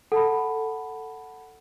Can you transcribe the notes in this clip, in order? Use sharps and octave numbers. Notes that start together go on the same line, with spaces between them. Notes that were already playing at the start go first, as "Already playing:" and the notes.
A4 F#5 A5 B5